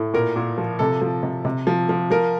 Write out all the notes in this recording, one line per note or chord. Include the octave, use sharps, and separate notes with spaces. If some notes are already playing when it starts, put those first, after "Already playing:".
Already playing: A2
A#2 A#4
A#2
F3
C3 A4
F3
C3
C3
F3
F3
F3 A#4